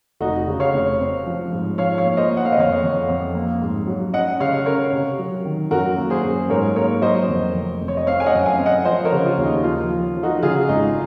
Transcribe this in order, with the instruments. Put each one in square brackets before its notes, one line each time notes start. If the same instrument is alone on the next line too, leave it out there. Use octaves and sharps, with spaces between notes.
[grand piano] F1 [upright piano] D#4 F#4
[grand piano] C#3
[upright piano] C#5 F5
[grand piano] F1
C4
F3
G#2
[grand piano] F3 [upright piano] C#5 F5
[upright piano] C#5 F5
[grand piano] A#3
[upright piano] C5 D#5
[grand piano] A#3
[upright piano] F#5
F5
D#5
[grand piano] F2 [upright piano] C#5 F5
[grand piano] F2
F2
A#3
G#2
F#3
[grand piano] C#4 [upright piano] D#5 F#5
[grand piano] C#3 [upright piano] C#5 F5
[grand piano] C#4 [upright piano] A#4 C#5
[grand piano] C3
F#3
D#3
[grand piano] F#2 [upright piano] F#4 A#4
[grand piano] A#3
[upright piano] G#4 C5
[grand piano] F#2
[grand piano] G#2 [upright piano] A#4 C#5
[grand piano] A#3 [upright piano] A#4 C#5
[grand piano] F#3 [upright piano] C5 D#5
[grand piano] F2
F1
F1
[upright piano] C#5
D#5
[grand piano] C4 [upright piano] C#5 F5
[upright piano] G#5
D#5 F#5
[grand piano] F#2
[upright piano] F5 G#5
[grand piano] C4
[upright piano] D#5 F#5
[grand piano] F3 [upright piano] C5 D#5
[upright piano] A#4 C#5
[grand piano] C#3
[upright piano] F4
[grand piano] D#2
[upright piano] D#4
[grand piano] F3 [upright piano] F4
[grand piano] F3
F3
[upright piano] D#4 F#4
F#4
[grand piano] C#3 [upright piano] F4 G#4
[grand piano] G#1 [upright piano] D#4